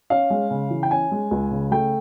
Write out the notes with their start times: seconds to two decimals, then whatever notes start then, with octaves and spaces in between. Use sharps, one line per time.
0.10 C#4 F5
0.30 G#3
0.51 C#3
0.70 E3
0.83 G5
0.91 C#4 G#5
1.11 G#3
1.31 C#2
1.51 C#3
1.71 A3 G5